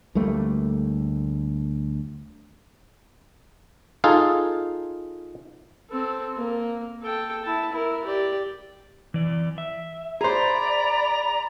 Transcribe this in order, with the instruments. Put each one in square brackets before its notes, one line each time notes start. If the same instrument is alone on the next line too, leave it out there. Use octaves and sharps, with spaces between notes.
[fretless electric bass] D2 G3 A3 A#3
[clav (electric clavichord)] D#4 F4 G#4 A4 F5
[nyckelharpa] C4 A4
A#3
A4 G5
E4 A5
E4 A#4
G4 D5
[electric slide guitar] E3 D5
E5
[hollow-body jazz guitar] G#4 C5 [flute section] D5 B5 [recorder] A#5